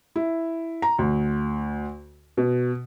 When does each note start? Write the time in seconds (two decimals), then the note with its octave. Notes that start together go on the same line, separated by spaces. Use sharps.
0.16 E4
0.82 A#5
0.99 D2
2.37 B2